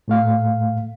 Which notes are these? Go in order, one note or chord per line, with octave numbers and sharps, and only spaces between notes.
A2 A3 F5